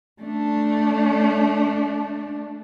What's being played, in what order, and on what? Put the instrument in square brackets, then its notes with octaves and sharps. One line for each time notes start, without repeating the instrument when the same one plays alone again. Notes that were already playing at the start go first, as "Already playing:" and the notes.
[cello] A3 D4